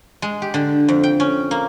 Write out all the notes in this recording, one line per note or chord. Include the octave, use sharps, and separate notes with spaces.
G#3
G4
D3
F2
G5
C#4
A#3